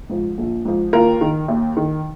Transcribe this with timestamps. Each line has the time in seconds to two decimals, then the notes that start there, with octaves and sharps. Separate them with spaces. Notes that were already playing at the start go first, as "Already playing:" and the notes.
0.09 G#2 F3
0.38 A#1
0.65 G#2 F3
0.93 D#2 F4 A#4
1.21 D#3
1.48 D#2
1.77 D#3